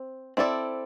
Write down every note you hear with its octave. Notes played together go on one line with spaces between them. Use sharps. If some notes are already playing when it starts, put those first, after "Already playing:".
Already playing: C4
C4 E4 A4 D5